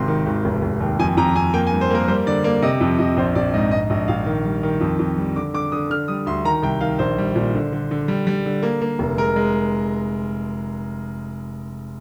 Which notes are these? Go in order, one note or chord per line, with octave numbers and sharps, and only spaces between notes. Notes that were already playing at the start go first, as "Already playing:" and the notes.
Already playing: G#1 C3 C6
D#3
G#1
F1
F1
D#2
F2 G#5
F2 A#5
F2 G#5
A#3 G5
G#5
G2
C5
A#3 A#4
G3 C5
D3 D5
A#3 D5
C3 D#5
F2
F2 D#5
A#1 C5
A#1 D5
G#2 D#5
G#2 D#5
A#1 D#5
A#1 F5
D#3
G3
D#3
F2
F2
G3
D3 D6
D3 D6
D3 D#6
D3 F6
G3 D#6
D2 C6
D#3 A#5
C2 G5
D#3 F5
A#1 C5
G3
A#2
D3
D3
D3
G3
G3
D3
A#3
A#3
F1
G#3 A#4
G#3